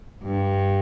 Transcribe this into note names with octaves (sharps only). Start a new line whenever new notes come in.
G2